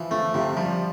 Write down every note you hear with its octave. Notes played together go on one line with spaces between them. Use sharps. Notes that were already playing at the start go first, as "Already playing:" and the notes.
Already playing: E3 F3
F3 A3
C3 F3
F3 G3